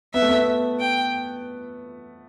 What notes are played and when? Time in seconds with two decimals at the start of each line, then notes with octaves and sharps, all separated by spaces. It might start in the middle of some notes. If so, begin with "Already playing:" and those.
0.14 B3 E5
0.22 A3
0.29 B3
0.80 G5